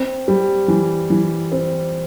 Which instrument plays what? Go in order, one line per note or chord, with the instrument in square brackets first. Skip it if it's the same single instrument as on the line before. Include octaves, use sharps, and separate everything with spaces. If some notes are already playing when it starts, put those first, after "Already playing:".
Already playing: [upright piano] C4
G3
E3
E3
C4